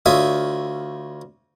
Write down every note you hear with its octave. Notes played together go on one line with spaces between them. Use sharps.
D2 F4 C#5 E5 D#6